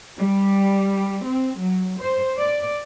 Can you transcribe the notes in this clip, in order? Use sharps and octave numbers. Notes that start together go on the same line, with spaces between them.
G3
C4
F#3
C5
D5